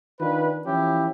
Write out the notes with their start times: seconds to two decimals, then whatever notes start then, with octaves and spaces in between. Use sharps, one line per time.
0.20 D#3 D4 F4 B4
0.66 E3 F3 C#4 E4 G4